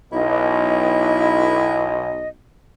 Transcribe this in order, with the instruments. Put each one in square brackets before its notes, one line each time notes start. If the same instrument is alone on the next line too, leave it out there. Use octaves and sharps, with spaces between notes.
[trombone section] B1 [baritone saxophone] E4 [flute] D#5